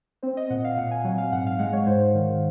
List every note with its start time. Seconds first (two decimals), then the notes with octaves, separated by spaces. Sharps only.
0.23 C4 C5
0.37 D#5
0.50 A#2 F#5
0.64 F5
0.78 A#2 F#5
0.91 G#5
1.04 F#3 F#5
1.18 F5
1.32 G#2 F#5
1.46 F5
1.59 G#3 F#5
1.73 C#5
1.87 G#2 C5
2.15 D#3